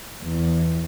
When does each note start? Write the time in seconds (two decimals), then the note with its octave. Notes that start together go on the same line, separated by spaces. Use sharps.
0.22 E2